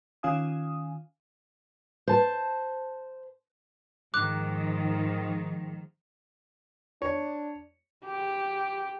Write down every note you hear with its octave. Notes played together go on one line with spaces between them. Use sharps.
D#3 C#4 F4 F5 G#5 D#6
C5 A5
G#2 D#3 F3 D6 F#6
D4 C#5
G4